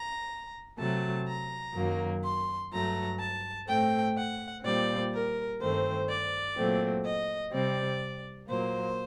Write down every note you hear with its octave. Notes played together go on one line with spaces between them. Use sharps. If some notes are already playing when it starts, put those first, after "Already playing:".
Already playing: A#5
C3 F#3 A3 A5
A#5
F#2 D#3 F#3 A#3
C6
G2 F#3 A3 A#5
A5
A2 A3 C4 G5
F#5
A#2 G3 C4 D5
A#4
G2 D#3 A3 C4 C5
D5
A#2 F#3 A3 C4
D#5
C3 G3 C4 D5
A#2 F#3 A#3 C5